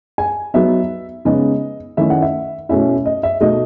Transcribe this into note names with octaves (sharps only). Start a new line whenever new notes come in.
G#5
F#3 B3 D#4 E5
C#3 G#3 B3 D#4 D#5
D#3 A3 C#4 E4 E5
F#5
E5
B2 A3 C#4 E4 E5
D#5
E5
B2 A3 D#4 D#5